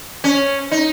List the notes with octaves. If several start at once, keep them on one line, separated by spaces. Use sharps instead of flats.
C#4
D#4